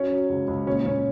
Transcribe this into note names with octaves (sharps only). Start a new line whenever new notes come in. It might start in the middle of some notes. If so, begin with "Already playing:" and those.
Already playing: F#3 C#4
F#3
C#2
C#2
A#2 C#4
A#2 C#4